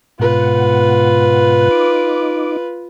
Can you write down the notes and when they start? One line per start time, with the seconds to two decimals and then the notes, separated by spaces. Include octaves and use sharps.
0.19 G#2 B2 F4 B4 F#5
1.71 D#4 D6